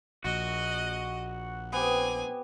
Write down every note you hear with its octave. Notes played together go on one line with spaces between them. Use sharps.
A#1 F#4 D#5
B3 C4 G4 G#5